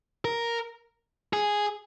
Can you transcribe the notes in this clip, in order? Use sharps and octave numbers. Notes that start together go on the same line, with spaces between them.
A#4
G#4